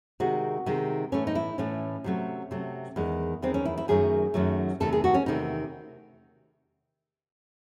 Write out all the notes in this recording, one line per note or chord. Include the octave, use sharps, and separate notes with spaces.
C3 D#3 G#3 F#4
C3 D#3 G#3
A2 E3 A3 C#4
D#4
E4
A2 E3 A3 C#4
C3 F#3 A3
C3 F#3 A3
E2 D#3 G#3
E2 D#3 G#3 C4
C#4
E4
E4
F#2 D#3 F#3 A3 G#4
F#2 D#3 F#3 A3
E2 C3 D#3 A3 A4
G#4
F#4
C#4
E2 C3 D#3 A3 D#4